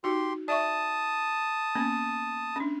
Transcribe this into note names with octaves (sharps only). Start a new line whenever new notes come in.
D#4 F#4 G4 C6
D5 E5 A5 C#6 D#6
A#3 B3 C#4
C#4 D4